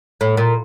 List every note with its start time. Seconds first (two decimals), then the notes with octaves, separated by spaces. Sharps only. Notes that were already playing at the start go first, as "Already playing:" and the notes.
0.21 A2
0.37 A#2